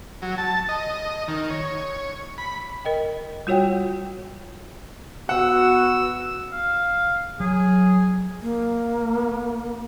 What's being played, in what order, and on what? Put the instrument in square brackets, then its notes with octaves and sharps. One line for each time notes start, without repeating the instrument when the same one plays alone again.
[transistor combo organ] F#3
A5
D#5
D#3
C#5
B5
[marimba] A#4 D#5 G5
G3 F4 F#4 C#5 F#5 G5
[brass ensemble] B3 F#4 [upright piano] F#5 [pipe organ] E6
[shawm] F5
[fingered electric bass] F#3 [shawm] G#4
[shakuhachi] A#3